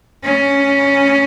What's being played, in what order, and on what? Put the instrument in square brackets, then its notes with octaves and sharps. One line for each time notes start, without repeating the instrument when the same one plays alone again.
[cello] C#4